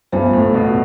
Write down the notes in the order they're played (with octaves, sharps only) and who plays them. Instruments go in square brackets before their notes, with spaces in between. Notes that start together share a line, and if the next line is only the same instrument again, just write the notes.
[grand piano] G2 [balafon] G3 B3 F4 C5
[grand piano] A2
B2